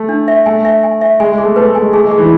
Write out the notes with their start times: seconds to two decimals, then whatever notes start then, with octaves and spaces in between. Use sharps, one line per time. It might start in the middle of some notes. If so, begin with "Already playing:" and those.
Already playing: A3
0.09 D4
0.28 E5
0.46 A3 G#5
0.65 E5
0.83 G#5
1.01 E5
1.20 G#3 G#5
1.32 G#3
1.38 G#4
1.44 A3
1.56 A3 B4
1.69 A3
1.75 G#5
1.81 G#3
1.93 A3 G#4
2.05 G#3
2.11 G#4
2.18 E3